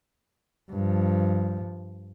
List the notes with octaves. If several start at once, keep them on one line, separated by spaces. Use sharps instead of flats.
G2 F3